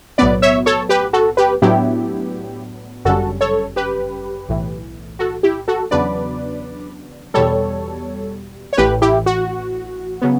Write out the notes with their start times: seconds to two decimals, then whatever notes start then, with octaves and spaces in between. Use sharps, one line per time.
0.18 B1 A2 F#3 B3 B4 D5
0.42 C#5 E5
0.66 A4 C#5
0.89 G4 B4
1.13 F#4 A4
1.37 G4 B4
1.62 A2 F#3 B3 D4 E4 G4
3.05 G1 F#2 C#3 G3 C#4 F#4 A4
3.41 A4 C#5
3.76 G4 B4
4.49 B1 A2 E3
5.19 F#4 A4
5.43 E4 G4
5.68 F#4 A4
5.91 E2 C#3 F#3 B3 D4 B4 D5
7.34 E2 B2 G3 A4 C#5
8.73 C#5
8.77 A1 A2 E3 G4 B4
9.02 E4 G4
9.26 F#4
10.21 C#3 F#3 B3